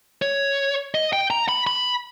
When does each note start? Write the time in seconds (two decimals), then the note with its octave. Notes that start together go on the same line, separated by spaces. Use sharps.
0.22 C#5
0.95 D#5
1.13 G5
1.30 A#5
1.49 B5
1.67 B5